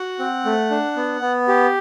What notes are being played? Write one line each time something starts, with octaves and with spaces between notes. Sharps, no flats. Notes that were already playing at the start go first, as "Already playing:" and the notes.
Already playing: F#4 F#5
C4
A3
D4
B3
B3
G4